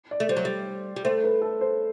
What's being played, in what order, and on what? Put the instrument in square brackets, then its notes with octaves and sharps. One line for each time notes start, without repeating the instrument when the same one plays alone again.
[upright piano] D5
[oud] A3
[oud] G3 [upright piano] C5
[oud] F#3
G3
G3
[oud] A3 [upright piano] C5
[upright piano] B4
A4
C5